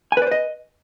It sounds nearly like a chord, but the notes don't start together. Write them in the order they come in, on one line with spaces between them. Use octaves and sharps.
G#5 B4 D5 C5 D#5